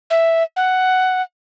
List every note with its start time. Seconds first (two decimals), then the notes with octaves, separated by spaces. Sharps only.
0.10 E5
0.56 F#5